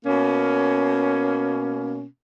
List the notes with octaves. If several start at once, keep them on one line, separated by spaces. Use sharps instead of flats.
B2 A#3 C#4